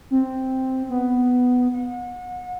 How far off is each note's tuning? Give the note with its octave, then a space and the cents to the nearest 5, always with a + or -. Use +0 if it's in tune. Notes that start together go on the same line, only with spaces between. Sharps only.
C4 +0
B3 +10
F#5 -35